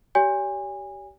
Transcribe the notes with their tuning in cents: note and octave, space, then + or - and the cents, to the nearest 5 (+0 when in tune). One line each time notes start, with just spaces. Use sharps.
G4 -20 C#5 +45 G#5 -30